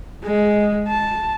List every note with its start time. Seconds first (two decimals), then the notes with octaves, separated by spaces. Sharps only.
0.24 G#3
0.88 A5